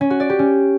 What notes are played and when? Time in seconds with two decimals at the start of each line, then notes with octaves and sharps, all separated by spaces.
0.01 C#4
0.10 F#4
0.20 D5
0.29 G4
0.39 C#4